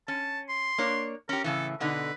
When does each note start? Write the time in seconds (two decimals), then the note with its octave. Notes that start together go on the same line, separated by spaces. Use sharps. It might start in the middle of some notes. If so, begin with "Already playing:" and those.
0.08 C#4 A5
0.49 C6
0.78 A#3 D4 C#5
1.29 C#4 G4 A#4
1.44 A2 C#3 E3 A4
1.80 B2 D3 D#4 B4